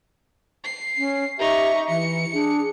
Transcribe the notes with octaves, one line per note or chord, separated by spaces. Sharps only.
C7
C#4
D#4 G4 E5 C#6
E3 C#7
D4 G#4